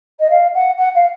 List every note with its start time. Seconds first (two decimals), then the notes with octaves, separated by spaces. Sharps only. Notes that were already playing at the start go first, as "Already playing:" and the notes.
0.19 D#5
0.30 F5
0.54 F#5
0.78 F#5
0.95 F5